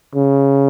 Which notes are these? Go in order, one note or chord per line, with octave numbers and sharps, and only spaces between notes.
C#3